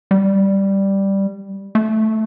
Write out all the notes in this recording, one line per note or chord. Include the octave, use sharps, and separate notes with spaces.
G3
A3